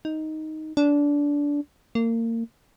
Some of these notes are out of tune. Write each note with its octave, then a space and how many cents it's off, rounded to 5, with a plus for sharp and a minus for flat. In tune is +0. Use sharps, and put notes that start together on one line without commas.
D#4 +5
D4 -20
A#3 -30